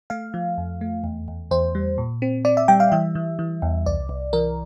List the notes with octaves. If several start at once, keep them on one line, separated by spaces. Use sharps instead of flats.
A3 F5
F3
F2
A3
E2
E2
E2 C5
G3
A#2
C4
C4 D5
E5
G3 G5
F5
E3 E5
E3
E3
E2
C2 D5
C2
E3 A#4